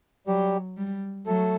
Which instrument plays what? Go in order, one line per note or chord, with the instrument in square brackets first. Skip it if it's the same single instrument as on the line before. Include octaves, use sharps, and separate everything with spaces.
[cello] F#3 [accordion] G3 G4
[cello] G3
[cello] F#3 [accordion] A3 A4